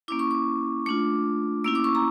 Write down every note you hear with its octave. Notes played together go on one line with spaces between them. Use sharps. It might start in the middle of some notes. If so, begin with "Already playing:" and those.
A#3 C#4 E4 D6
C#6
D6
A3 D4 F4 D6
A#3 C#4 E4 E6
D6
C#6
A#5